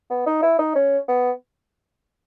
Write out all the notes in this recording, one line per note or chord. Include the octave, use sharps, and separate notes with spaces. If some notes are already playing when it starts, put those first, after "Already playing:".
B3
D#4
E4
D#4
C#4
B3